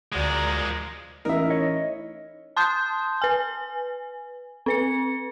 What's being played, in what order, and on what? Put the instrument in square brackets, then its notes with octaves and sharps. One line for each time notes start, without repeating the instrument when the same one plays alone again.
[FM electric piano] D2 F#4 A#6 [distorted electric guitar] F3 G#3 [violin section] A#4 D5
[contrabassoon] A1 [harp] D#4 E4 [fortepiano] A#4 E5
[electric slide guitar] C#5 D#5
[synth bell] A5 C6 D#6 G6
B4 G#5
C4 B4 C#7